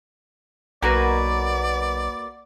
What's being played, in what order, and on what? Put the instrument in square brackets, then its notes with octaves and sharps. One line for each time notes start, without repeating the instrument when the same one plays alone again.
[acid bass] B1 [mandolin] A#3 F#4 B4 [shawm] D5